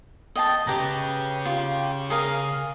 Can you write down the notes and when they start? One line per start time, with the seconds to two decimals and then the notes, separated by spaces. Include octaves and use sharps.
0.36 D#5 G5 A5
0.67 C#3 G4 B4 A#5
1.45 F4 G4
2.10 G#4 A#4 F5